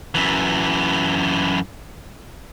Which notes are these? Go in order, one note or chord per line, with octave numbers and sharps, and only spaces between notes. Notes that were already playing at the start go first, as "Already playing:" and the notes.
F#2 E3